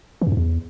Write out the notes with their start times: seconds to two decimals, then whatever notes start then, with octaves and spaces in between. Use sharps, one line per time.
0.21 E3
0.27 F#2
0.32 G2
0.37 E2